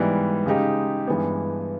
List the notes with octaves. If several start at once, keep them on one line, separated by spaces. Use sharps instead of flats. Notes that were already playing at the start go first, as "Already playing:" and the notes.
Already playing: G#2 E3 G3 B3
C#3 G#3 D#4 G4
G2 E3 G#3 B3